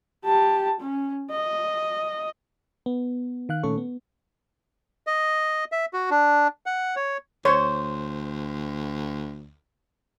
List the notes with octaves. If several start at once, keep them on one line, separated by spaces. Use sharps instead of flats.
G4 A5
C#4
D#5
B3
D#3 F5 F#6
A#2 D#3 A3 C#4 A4 C#6
B3
D#5
E5
F#4
D4
F#5
C#5
D2 C5 C#5